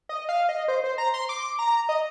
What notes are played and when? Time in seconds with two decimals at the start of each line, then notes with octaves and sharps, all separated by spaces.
0.09 D#5
0.29 F5
0.49 D#5
0.68 C5
0.84 C5
0.98 A#5
1.14 C6
1.29 D6
1.59 A#5
1.89 D#5